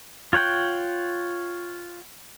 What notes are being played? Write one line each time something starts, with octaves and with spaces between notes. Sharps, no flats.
F4 C#5 F#5 G5